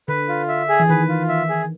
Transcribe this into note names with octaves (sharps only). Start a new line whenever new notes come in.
D3 B4
F4
E5
G#4
E3
D#3 B4
F4
E5
G#4